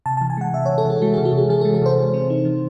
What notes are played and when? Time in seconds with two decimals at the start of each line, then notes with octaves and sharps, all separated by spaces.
0.06 C3 A5
0.17 A5
0.21 E3
0.30 G#5
0.37 G#3 F#5
0.53 C3 E5
0.66 C#5
0.70 C3
0.78 A4
0.85 E3 G#4
1.01 G#3 F#4
1.14 G#4
1.18 C3
1.25 F#4
1.33 C3 G#4
1.49 E3 G#4
1.61 A4
1.65 G#3
1.74 A4
1.82 C3 C5
1.98 E3
2.14 C4
2.30 D#4
2.45 E3